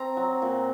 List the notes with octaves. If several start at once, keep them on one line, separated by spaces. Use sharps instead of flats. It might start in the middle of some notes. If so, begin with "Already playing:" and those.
Already playing: C4 A#5
F#3
A#2